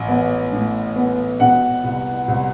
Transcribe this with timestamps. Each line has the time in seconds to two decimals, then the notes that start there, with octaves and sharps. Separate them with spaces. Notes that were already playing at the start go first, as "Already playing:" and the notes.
Already playing: A1
0.08 B3
0.52 A2
0.96 B3
1.40 B2 F#5
1.84 C2
2.28 C2